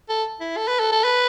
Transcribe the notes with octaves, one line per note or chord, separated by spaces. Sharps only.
A4
E4
A4
B4
A4
A4
B4